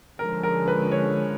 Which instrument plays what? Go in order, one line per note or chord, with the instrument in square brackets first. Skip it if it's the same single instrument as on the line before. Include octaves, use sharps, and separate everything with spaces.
[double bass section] D3 F3 G#3 C#4 [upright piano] A#4
[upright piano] A#4
B4
C#5